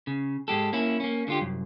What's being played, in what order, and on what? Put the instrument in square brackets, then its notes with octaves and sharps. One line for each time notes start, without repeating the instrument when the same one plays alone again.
[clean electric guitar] C#3
G#2 G#3 G4 A4
A#3 C#4 E4
A#3 C#4
D3 F4 G4
C2 F#2